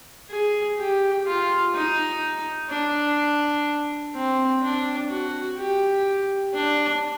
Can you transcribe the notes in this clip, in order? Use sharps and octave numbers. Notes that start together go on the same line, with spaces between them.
G#4
G4
F4
D#4
D4
C4
D4
F#4
G4
D4